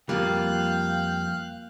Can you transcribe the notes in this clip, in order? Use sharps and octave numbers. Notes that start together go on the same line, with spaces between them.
F2 G3 A#3 F4 F5 G5 F#6